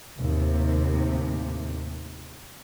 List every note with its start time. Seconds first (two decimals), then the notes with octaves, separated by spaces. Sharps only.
0.18 D#2 A2 C3